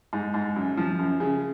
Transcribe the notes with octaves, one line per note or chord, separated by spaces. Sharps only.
G#2
G#2
F#2
F3
F#2
C#3